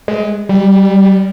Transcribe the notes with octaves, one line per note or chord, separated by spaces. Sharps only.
G#3
G3